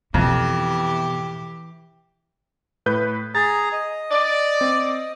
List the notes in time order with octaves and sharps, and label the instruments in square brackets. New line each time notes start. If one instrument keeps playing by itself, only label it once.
[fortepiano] F2 [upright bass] B2 [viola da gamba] E3 G4
[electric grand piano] A2 B4 G6
[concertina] G#4 A#5 [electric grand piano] A6
[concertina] D#5
[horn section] D5
[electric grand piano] C4